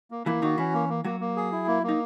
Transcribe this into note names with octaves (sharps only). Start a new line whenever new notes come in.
A#3
E3 A#3 E4
D#3 D#4 F#4
E3 C#4 E4
A#3
A#3
F#3 A#3 F#4
A#3
G#4
E4
A#3
A#3
D#4